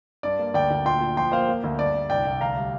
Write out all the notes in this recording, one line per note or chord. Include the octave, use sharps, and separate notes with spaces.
G2 D5
A#3
D2 D5 G5
D2
A#2 G5 C6
A#2
F3 G5 C6
A#3 C5 F5
A#3
D2
G2 D5
G2
C2 D5 G5
C2
D2 F5 A#5
G3